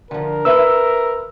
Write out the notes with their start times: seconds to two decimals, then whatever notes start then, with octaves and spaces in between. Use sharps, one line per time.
0.11 D3 F3 A#4
0.45 B4 E5 E6